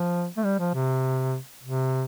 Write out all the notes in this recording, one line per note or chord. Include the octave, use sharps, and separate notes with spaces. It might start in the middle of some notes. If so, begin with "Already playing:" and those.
Already playing: F3
A3
G3
F3
C3
C3